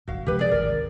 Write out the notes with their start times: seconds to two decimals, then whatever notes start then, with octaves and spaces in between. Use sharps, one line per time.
0.08 D1 G1 F#4 F5
0.26 C3 F3 G#3 G4 B4
0.39 G#4 D5
0.51 D1 G#1 A#4